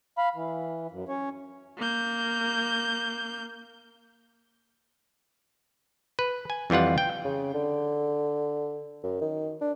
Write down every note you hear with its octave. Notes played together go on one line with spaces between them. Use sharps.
F5 B5
E3
F#2
C#4 C#5
A#3 G6
B4
G#5
F2 E3 G3 F4 F#5
G5
C#3
D3
F#2
D#3
D4